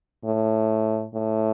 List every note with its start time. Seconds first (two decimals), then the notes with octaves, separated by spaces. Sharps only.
0.25 A2
1.14 A2